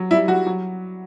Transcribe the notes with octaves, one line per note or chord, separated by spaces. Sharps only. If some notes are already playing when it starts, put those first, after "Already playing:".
Already playing: F#3
G3 E4
G3 F#4
F#3